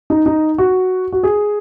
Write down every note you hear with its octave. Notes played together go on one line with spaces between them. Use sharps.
D#4
D#4
F#4
F#4
G#4